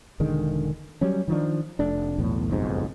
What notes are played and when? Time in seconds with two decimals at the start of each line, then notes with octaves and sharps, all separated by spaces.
0.20 E1 D3 D#3 G#3
1.01 F#3 G3 C#4
1.28 D#3 F3 D4
1.79 F1 A3 D4
2.18 B1 E2 A2 B3
2.48 F#1 B1 F2 G#2